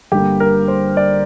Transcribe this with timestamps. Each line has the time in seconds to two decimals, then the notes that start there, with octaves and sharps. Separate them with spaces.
0.12 G1 G2 D3 G3 A#3 G4
0.40 A#4
0.68 C5
0.97 D5